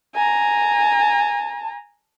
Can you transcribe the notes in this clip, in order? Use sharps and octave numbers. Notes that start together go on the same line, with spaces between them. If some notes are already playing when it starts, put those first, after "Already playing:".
G#5 A#5